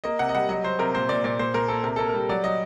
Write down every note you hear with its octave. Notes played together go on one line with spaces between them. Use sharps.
A#3 D#5
C3 F#5
D#5
G3 F#5
F#3 D#5
F#3 C5
C3 A#4
A#2 C5
A#2 D5
A#2 D5
A#2 C5
A#2 A#4
A#3 A4
C3 A#4
A#3 A4
G3 A#4
F#3 D5
F#3 D#5